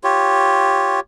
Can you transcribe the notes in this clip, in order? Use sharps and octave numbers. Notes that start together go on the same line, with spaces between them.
F4 G4 C#5